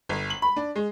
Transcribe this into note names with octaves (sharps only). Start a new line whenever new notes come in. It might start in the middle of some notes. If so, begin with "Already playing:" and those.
G1
F#7
B5
D4
G#3